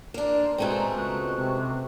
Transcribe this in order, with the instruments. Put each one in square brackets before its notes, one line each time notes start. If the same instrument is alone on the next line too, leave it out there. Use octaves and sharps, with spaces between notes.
[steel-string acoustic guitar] A#3 D4 [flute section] A#4 C5 D5
[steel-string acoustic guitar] B2 A3 C4 [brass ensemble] G#3 [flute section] G5 A#5
[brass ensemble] C#2 [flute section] C#6 F#6
[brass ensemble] C3